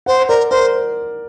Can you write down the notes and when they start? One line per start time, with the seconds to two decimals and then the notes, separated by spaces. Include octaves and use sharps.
0.06 C5 F#5
0.28 A#4 D5
0.50 A#4 C5